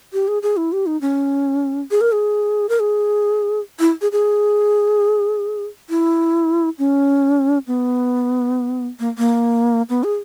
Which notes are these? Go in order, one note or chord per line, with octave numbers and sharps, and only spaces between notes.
G4
G#4
G#4
E4
G4
D#4
C#4
G#4
A#4
G#4
A#4
G#4
E4
G#4
G#4
E4
C#4
B3
A#3
A#3
B3
G#4